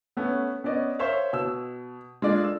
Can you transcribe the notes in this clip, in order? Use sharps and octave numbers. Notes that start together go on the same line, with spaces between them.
A3 B3 C#4
B3 C#4 D5 D#5
A#4 C5 C#5 E5 F5
B2 E6
G#3 D4 F4 A4 D5
E6